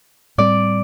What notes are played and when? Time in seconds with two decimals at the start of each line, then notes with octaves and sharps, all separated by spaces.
0.38 A2 G3 C4 D5